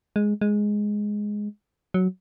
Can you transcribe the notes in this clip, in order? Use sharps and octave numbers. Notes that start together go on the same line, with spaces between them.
G#3
G#3
F#3